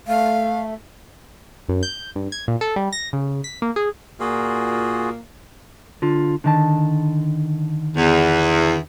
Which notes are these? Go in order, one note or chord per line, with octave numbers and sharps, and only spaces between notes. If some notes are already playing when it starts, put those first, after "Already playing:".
A3 F5
F#2
G6
G2
G#6
A#2
A4
G3
A#6
C#3
B6
A#3
G#4
A#2 A#3 F4 F#4 G#4
D3 F4
D3 D#3 A5
E2